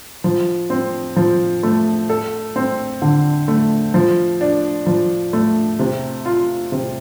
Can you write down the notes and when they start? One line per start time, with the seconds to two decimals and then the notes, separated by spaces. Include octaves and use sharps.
0.24 F3
0.70 C4
1.16 F3
1.63 A3
2.10 A4
2.56 C4
3.02 D3
3.48 A3
3.94 F3
4.41 D4
4.87 F3
5.33 A3
5.79 C3
6.26 F4
6.72 C3